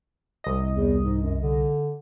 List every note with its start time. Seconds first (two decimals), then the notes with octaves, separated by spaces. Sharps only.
0.44 C2 D#5
0.73 E2
1.01 G#2
1.22 F#2
1.40 D3